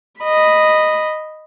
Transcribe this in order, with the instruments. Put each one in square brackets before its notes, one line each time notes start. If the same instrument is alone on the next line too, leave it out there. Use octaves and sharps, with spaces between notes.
[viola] D#5 B5